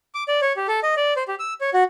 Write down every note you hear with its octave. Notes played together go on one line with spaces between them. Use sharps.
D6
D5
C#5
G4
A4
D#5
D5
C5
G4
E6
C#5
F#4